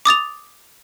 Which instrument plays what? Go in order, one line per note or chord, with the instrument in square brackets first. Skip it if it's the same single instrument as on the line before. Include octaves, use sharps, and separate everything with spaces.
[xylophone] D6 D#6 A6 F7